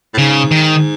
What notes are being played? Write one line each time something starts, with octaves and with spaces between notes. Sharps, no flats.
A2
G#2 C#3
D#3